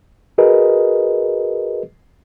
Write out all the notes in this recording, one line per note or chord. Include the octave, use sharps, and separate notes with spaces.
F#4 G#4 A#4 B4 D#5